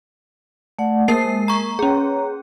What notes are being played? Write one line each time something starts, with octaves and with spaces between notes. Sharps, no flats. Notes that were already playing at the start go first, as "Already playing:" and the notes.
A3 D5 F#5
A#3 A#4 C5 A5 C7
G#3
A#5 C#6
C#4 G#4 C#5 A#5